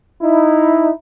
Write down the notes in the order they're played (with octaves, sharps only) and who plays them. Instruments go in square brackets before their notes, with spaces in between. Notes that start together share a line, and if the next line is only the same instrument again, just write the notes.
[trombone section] D#4 E4